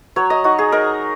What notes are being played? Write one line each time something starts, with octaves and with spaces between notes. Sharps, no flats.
F#3 C#5
D#5
D#4 F#4
G#4
D#4 A#4